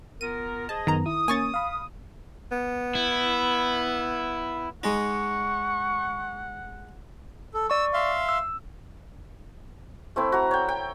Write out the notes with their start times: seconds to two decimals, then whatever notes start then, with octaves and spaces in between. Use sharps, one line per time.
0.21 B3 F4 A#4 D#7
0.69 G#4 C5 D#5 A5
0.87 F#2 D#3 B3 A#5
1.06 E4 D#6
1.28 A#3 C#4 G#5 C#6 A6
1.54 F5 B5
2.52 B3
2.95 E4
4.83 G#3 D#4 F#5 C#6
7.54 A4
7.70 D5 C#6 E6
7.93 E5 F5 C6
8.29 E6
10.16 A3 C4 E4
10.32 F#4 A#5
10.51 C#5 G5
10.68 G5